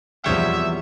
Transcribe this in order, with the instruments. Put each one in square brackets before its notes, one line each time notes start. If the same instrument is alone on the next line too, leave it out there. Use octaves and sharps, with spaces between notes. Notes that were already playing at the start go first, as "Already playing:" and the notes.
[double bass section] E2 [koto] C3 C#5 F#5 [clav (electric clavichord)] F3 G3 G5 [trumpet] E5